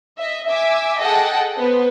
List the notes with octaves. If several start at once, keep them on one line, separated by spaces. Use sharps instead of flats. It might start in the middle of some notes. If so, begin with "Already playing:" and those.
D#5 E5
E5 G#5 D6 E6
G#4 A4 D#5 F#5 G5 A5
B3 B4 C5